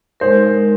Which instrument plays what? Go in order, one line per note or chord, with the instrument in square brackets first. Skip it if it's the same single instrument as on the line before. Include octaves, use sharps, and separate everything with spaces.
[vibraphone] G#3 D#4 A#4 [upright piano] C5